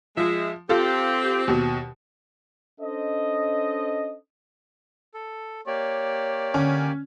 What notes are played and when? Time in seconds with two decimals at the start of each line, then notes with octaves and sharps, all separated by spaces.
0.17 F3 G#3 E5
0.69 C4 F4 G4 A4
1.48 D#2 B2
2.81 C#4 D4 A4 C5 D#5
5.14 A4
5.67 A#3 G4 C#5 D5
6.54 D3 C#4